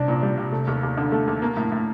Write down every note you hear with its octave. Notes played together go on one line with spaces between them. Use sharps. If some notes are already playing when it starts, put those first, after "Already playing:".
Already playing: C2 D4
A#2
G3
C2
A3
D#2
D#2
D3
A3
D#2
A#3
A2
A2